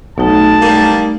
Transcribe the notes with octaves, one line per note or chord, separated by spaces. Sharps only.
B1 A3 D#4 A5
G3 A#3